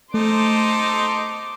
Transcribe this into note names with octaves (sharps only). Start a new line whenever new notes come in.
A3 D#4 A4 C5 C6 D6